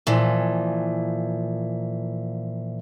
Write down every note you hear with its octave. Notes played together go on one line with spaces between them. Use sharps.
A#2 E3 F3